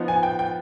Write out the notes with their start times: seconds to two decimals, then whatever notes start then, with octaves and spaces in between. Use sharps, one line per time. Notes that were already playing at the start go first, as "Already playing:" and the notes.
Already playing: F3 B3 D#4
0.08 G#5
0.23 G5
0.39 G5